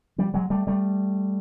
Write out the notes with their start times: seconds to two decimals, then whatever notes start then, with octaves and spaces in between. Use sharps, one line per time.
0.18 F3 G3
0.34 F#3 G#3
0.50 G3 A3
0.67 G3 A3